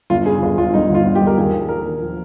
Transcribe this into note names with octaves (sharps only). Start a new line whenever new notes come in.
G1 F4
C#3 G#4
G1
G1 F4
G1 D#4
G1
F4
G1
G4
G1
A#4
D#2 G#4
D#2
D#2 A#4
D#2
F3